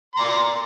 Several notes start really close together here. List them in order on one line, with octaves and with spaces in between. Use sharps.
C6 A#5 D5